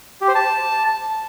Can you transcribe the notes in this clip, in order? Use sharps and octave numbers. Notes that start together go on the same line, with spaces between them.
G4
C5
A5